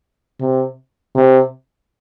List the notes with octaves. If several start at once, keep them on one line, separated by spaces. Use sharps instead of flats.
C3
C3